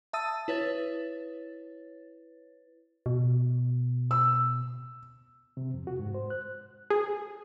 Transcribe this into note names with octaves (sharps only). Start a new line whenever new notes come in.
E5 A5 D#6 E6 A6 D#7
E4 B4 C#5 A6
B2
E6
C3
F2
F#4
G#2
C5
F#6
G#4